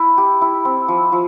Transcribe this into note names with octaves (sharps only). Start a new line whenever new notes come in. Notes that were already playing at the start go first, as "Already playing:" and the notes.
Already playing: E4
G4
E4
C4
F3
F3